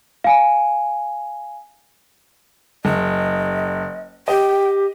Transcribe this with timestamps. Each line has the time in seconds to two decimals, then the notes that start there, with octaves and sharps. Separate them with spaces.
0.24 F5 G#5
2.85 F#1 D#5
4.28 G4 D#5 G5